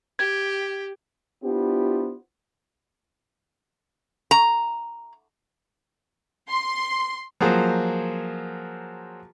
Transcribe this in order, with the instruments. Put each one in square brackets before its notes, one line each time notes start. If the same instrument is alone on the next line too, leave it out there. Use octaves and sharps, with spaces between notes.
[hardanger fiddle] G4 [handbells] G#6
[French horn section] B3 D4 E4 F4 G4 C5
[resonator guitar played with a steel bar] A#5
[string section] C6
[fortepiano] F3 F#3 A#3 G#4 C5